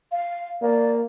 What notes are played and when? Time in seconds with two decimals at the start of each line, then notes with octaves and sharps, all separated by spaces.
0.12 F5
0.62 A#3 D5